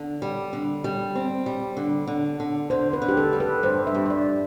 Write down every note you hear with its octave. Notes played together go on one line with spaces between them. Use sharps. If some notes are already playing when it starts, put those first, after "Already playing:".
Already playing: D3
G3
D3
G3
C4
G3
D3
D3
D3
D3 C5
B4
D3
G4
A4
G3
B4
G2 C5
E5
G2
E5
D5